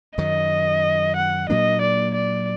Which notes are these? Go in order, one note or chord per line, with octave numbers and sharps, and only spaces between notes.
F#2 D#3 F#3 D#5
F#5
A#2 F#3 A#3 D4 D#5
D5
D5